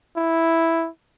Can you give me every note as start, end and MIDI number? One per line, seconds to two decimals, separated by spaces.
0.17 0.89 64